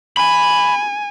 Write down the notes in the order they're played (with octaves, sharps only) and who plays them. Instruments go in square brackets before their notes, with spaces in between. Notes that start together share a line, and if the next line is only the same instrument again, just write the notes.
[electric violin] G#5 [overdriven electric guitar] B5